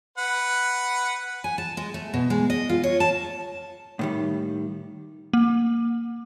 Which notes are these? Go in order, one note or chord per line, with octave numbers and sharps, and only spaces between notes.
B4 F#5
G#5
A5
G#3
A3
B2
G#3
D#5
F4
C#5
A5
A2 D#3 G3
A#3